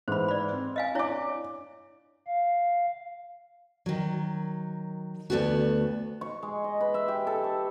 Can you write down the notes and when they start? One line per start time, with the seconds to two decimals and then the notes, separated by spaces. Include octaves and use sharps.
0.08 G#2 E3 C5 B5
0.28 D5 B5
0.52 C4
0.76 D#5 F5 G#5
0.95 D4 E4 C#5 D5 D6
2.27 F5
3.86 D#3 F#3
5.30 D2 C3 A3 B3 D4 F#4
6.21 C#6
6.43 G#3
6.64 D#5
6.81 B4
6.94 E5
7.08 G4
7.27 A4
7.44 C#6